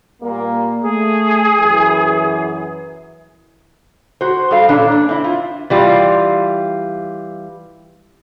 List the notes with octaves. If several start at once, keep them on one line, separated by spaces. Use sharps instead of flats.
A#2 G3 A#3
A3 G#4
F#2 E3
F#4 C5
G3 A4 F5
A#2 E3 C#4 D4 A4
D4
C4 E4
F4
E3 G3 F4